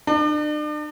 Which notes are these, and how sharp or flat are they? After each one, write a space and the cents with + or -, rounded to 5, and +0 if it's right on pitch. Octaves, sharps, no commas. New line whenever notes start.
D4 +40